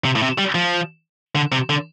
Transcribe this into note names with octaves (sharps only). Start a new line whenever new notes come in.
C3
A2
C3
G3
F3
D3
C3
D3